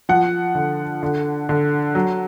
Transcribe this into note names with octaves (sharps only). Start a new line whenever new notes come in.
F3 F#5
D3
D3
D3
F#3